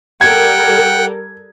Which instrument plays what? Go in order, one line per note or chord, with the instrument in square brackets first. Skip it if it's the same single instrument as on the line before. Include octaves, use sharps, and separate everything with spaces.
[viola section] G3 A4 A#4 [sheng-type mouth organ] F#5 G5 [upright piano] G#6